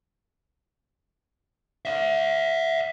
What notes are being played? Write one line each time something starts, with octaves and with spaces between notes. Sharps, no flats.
D5 E5